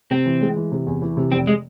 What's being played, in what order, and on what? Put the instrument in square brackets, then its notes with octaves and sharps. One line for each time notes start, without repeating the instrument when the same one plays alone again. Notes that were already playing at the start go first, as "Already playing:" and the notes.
[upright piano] C3 [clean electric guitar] C4
[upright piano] E3
G#3
E3
C3
E2
E3
C3
[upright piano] F1 [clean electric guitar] C4
[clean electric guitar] G#3